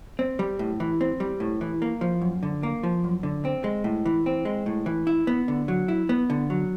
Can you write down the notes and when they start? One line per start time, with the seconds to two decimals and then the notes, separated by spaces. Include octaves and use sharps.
0.19 C4
0.39 G3
0.59 A2
0.80 E3
1.01 C4
1.20 G3
1.40 A2
1.61 E3
1.82 A#3
2.01 F3
2.22 F#2
2.43 D3
2.63 A#3
2.83 F3
3.04 F#2
3.23 D3
3.45 C4
3.64 G#3
3.84 A2
4.06 E3
4.26 C4
4.45 G#3
4.66 A2
4.86 E3
5.07 E4
5.27 B3
5.48 D3
5.68 F#3
5.88 E4
6.09 B3
6.30 D3
6.50 F#3